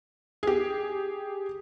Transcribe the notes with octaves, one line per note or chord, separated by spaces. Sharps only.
G4 G#4